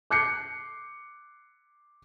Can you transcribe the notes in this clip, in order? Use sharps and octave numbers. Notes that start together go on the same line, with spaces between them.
D6 F#6 G6 C7 C#7